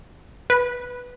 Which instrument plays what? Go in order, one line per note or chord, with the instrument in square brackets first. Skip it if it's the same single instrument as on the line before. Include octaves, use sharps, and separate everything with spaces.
[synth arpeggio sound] B4